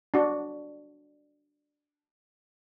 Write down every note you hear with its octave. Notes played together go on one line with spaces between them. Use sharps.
D4 F#4